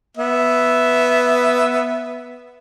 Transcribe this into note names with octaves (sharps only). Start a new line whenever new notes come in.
B3 E5